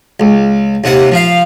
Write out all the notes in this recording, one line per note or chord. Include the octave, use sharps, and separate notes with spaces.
C#2
D#2 C3 F#5
F3 F5